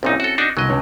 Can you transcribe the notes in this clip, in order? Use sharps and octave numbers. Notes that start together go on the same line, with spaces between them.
C2 A#2 C4 C#4 D#4 E4
F#4 A4
D4 D#4 F#4
C2 F#3 D#5
C#2 C#5